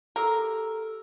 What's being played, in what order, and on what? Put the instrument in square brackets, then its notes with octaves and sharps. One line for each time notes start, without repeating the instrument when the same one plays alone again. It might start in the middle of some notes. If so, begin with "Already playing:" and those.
[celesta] G4 A4 E6 [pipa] A#4